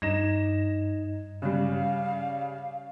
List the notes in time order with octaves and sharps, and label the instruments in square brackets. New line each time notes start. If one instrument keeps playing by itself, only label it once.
[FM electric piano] G2 [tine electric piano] D#4 D#5 G#6 [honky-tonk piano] A#6 E7
[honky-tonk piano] C#3 G3 [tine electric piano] C#4 [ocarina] F5